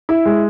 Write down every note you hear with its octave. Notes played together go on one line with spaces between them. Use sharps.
E4
G#3